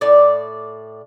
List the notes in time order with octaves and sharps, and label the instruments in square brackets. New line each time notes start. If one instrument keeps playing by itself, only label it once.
[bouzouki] A2 D5